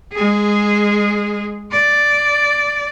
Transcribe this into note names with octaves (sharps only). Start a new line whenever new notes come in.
G#3 G#4
D5